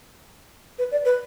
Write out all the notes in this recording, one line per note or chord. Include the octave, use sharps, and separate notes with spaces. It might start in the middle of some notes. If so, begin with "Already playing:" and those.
B4
D5
B4